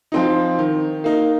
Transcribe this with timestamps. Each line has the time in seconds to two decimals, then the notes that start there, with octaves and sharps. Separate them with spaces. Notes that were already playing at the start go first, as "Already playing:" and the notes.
0.12 F3 C4 D#4
0.59 D#3
1.04 A#3 D#4